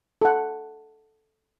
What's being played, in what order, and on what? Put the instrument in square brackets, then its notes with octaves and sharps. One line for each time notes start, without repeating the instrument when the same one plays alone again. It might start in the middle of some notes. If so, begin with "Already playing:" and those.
[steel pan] A4 F#5